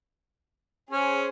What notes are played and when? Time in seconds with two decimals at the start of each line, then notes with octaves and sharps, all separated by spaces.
0.90 C#4 G#4 C5